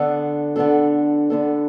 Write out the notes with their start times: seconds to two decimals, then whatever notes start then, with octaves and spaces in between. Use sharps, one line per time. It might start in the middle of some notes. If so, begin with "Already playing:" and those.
Already playing: D3 B3 D4 A4
0.56 D3 B3 D4 A4
1.30 D3 B3 D4 A4